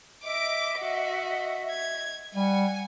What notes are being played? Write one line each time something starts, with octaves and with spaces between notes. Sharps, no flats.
D#5 E5 D6 D7
F#4
G#6
G3 F#5 G#5